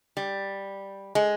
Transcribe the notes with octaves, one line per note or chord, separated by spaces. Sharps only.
G3
G#3